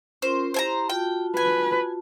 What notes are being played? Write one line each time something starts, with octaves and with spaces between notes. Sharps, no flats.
C#4 F4 A#4 C5
E4 G4 C5 G#5 A#5
F4 F#4 G5 A5
B4 G#5